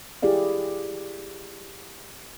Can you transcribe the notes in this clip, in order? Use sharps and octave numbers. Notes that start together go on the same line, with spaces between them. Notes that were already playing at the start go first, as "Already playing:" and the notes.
E4 G4 G#4 D5 F5